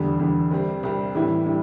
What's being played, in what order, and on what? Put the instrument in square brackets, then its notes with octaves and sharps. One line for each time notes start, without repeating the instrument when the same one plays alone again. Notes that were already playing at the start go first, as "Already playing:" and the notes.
Already playing: [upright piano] E2 D3 G3
E2 D3 G3
C2 C3 G3 C4
C2 C3 G3 C4
A2 E3 G3 E4
G3 E4